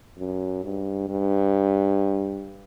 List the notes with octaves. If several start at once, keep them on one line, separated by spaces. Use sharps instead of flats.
F#2
G2
G2